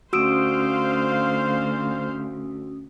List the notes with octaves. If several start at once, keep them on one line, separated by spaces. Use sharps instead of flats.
D2 C#4 F#4 C5 F5 D#6 E6 D7